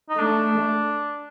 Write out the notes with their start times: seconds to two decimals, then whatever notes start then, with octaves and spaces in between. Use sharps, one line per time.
0.09 D#4
0.18 A3 D4